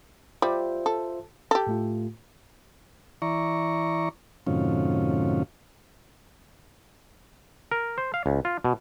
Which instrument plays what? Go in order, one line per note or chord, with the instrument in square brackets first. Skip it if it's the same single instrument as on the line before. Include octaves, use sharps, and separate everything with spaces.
[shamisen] G3 [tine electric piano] F4 C5 E5
[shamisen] A4
G4 A4
[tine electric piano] A2 A3 F4
[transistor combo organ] E3 E4 D5 A#5 C#6
F#2 A2 C3 D#3 C#4 F4
[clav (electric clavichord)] A#4
C5
F5
C#2
F4
B2